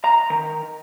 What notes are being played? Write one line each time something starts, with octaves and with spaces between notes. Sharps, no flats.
A#5
D#3